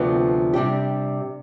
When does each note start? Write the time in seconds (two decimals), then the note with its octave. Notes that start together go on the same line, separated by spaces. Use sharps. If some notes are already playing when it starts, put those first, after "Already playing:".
Already playing: D2 C3 F3 B3 D4
0.53 C3 G3 D4 G4